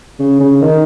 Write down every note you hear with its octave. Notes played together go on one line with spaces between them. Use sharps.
C#3
C#3
D#3